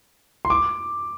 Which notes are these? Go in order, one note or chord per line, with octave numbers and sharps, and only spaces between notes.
C6
D6